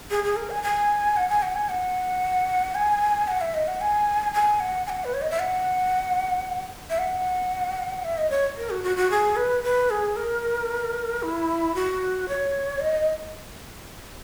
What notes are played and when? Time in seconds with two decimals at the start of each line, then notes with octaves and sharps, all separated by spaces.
0.11 G#4
0.24 G#4
0.36 A#4
0.50 G#5
0.63 G#5
1.17 F#5
1.29 G#5
1.42 F#5
1.55 G#5
1.69 F#5
2.75 G#5
3.28 F#5
3.41 E5
3.54 D#5
3.68 F#5
3.81 G#5
4.34 G#5
4.60 F#5
4.86 G#5
4.90 F#5
5.05 B4
5.14 C#5
5.22 D#5
5.31 E5
5.39 F#5
6.90 E5
6.99 F#5
8.05 E5
8.18 D#5
8.30 C#5
8.57 A#4
8.70 F#4
8.84 F#4
8.97 F#4
9.11 G#4
9.36 B4
9.64 B4
9.90 G#4
10.16 A#4
11.23 E4
11.75 F#4
12.29 C#5
12.80 D#5